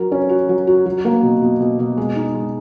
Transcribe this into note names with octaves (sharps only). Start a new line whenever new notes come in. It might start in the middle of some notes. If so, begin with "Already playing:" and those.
Already playing: F#3 A#4
C#4
F#4
F#3
F#4
F#3
A#3
B2
B2
B2
B2
G#3
D#4
G#3